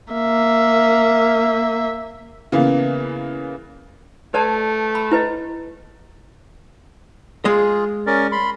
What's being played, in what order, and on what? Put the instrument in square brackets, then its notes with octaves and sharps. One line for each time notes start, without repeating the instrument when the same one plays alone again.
[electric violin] A#3 E5
[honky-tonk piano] C#3 E3 A#3 B3
[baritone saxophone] A3 [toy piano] B4 D5 A5
[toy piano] B5
E4 B4 D#5
[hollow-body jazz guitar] G#3 D#5 [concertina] F4 G#4
[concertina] C#4 A#4 D5
B5 C6